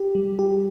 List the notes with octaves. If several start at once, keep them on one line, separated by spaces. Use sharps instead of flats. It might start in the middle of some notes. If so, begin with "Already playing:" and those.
Already playing: G4
G3
G4